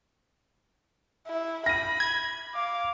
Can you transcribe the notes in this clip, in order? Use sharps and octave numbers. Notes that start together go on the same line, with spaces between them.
E4
B5 A#6 D#7
G#6
F5 D6